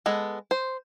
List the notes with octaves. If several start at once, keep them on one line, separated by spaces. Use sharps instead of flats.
G#3 B3 A4
C5